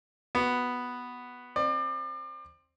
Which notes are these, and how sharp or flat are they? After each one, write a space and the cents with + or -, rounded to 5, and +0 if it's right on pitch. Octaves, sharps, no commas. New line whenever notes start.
B3 +0 F#4 +0
C4 +20 D5 +35